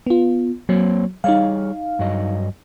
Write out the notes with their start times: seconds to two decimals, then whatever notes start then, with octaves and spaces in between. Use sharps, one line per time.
0.07 B3 F4
0.69 F#3 A#3 C4 C#5
1.24 G3 D#4 G#4 C#5 F5
1.99 G2 F#3 D#5